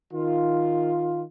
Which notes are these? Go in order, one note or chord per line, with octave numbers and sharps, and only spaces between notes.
D#3 F4